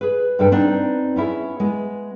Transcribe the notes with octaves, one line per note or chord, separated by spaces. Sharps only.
G#4 B4
G2 C3 G3 D4 A4 G5
B3 C4 D4 D#4
B3 C#4 E4 G#4
G#3 B3